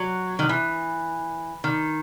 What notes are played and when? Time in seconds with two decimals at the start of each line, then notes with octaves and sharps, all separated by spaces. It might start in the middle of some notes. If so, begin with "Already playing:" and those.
Already playing: F#3
0.39 D#3
0.49 E3
1.64 D#3